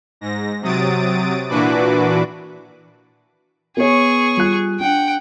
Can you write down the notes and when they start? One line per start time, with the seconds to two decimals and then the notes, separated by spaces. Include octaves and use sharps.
0.21 G#2 A#6
0.62 C3 F#3 D#6 A6 D7
1.49 A#2 E3 D4 F#4 B4 D6
3.77 B3 G#4 C#5 C#6
4.37 G3 F4 F#6
4.80 D4 F#5 G5